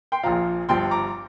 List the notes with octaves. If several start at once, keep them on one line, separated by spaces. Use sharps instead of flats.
G5 C6
A#1 A#2 F3 F5 A#5
G1 G2 F3 G5 C6
A#5 D6